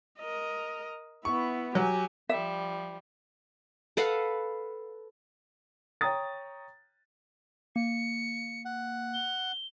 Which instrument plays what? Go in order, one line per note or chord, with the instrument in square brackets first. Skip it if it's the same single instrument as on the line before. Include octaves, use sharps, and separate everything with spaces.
[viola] A#4 D#5
[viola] B3 E4 [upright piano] C#6
[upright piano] F#3 [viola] G4 G#5
[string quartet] F3 G3 [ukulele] E5
[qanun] A4 B4 F5 F#5
[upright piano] C#5 G5 A#5 D#6 A6
[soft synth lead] A#3 [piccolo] C#7
[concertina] F#5
[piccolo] G7